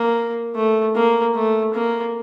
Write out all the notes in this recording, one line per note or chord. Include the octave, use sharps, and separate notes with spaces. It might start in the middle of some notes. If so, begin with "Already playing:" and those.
Already playing: A#3
A3
A#3
A3
A#3